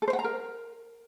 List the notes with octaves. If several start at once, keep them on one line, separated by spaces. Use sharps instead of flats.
A4
C5
F#5
A#5
A#4